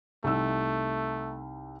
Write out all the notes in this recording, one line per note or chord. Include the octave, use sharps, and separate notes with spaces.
C2 A3 D#4 E6